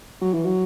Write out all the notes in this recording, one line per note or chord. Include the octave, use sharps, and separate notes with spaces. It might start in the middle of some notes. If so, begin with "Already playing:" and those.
F#3
E3
F#3